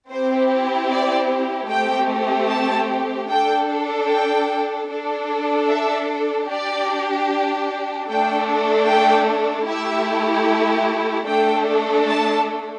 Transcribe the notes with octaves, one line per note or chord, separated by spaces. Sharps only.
C4 E4 G4 C5
D5
A3 C4 G4 G5
A5
D4 A4 G5
G5
D4 A4
E5
D4 G4 D5
A3 D4 A4 G5
G5
A3 E4 G4 E5
A3 D4 A4 G5
A5